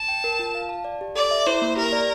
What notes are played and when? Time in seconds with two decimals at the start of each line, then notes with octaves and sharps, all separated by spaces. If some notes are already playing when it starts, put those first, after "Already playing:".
Already playing: A5
0.08 G5
0.24 A#4
0.39 F4
0.55 F5
0.69 A5
0.84 D5
1.01 G4
1.15 A4 D5
1.31 E5
1.47 E4 C5
1.62 A#3
1.77 G4 A#4
1.92 D5